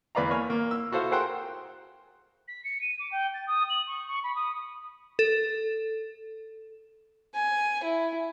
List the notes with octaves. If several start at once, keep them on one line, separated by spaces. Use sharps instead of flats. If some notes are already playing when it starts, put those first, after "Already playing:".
E2 B4 D5 F5 A#5
A#3 C#5 G#5 F6
A#3
E6
E4 F#4 A4 C5 F5
G#4 A#4 C5 F#5 G5 C6
B6
C#7
D#7
D6
G5
A6
D#6
F#7
C#6
C#6
B5
D#6
A4
G#5
E4